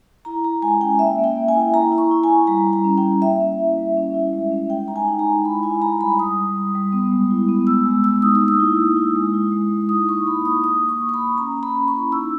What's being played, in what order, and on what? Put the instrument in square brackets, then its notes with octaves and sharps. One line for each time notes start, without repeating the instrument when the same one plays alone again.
[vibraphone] E4 A#5
E4 A#5
G#3 G#5
C#4 G5
A#3 E5
A#3 G5
A#3
G#5
E4
E4 A#5
E4
C#6
E4
G#5
E4
G3 A#5
G3
A#5
C#4
G5
E4
A#3 E5
C#4
E4
G3
C#4
E4
G#3
C#4
G#3 G5
D#4 A#5
G#5
D#4
A#5
G#3
E4 B5
E4 G#5
E4 A#5
G3 B5
G3 D#6
G3
G3
G3
B3
G#3
E4
B3
G#3 E6
G#3
G#3 E6
D#4 D#6
E6
A#3
D#6
E4
A#3
E4
G#3
E4
G#3
E4
D#4 D#6
A#3 C#6
A#3 B5
A#3 D#6
A#3 D#6
A#3
C#6
A#3
C#6
B5
A#3
C#4 A#5
A#3
B5
C#4
C#6
E4
D#4 E6